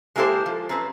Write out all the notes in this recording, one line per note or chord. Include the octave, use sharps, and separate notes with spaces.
G#3 A#3 E4 G4 A4 C5
F3
F#2 C4 B4